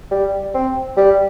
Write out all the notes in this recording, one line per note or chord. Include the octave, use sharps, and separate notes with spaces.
G3
C4
G3